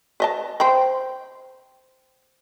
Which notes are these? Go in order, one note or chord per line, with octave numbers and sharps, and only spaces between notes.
B4 D#5 A5
C5 G5 B5